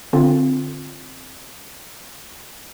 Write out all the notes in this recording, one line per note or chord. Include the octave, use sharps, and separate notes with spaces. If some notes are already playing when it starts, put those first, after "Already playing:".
D3 C4 F4